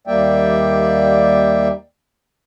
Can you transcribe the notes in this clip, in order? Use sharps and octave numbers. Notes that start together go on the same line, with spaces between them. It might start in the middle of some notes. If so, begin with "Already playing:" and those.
D#2 G3 A#3 D5 E5 G5